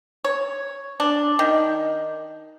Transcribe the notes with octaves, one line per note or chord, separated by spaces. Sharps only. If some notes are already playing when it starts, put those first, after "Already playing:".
C#5
D4
D#3